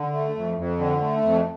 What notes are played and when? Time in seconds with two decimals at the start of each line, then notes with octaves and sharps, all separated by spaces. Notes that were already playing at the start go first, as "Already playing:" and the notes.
Already playing: D3
0.13 A3
0.35 F2
0.57 F2
0.79 D3
1.01 A3
1.23 F2